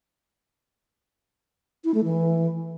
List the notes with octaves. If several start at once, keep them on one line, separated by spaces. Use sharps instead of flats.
E4
A3
E3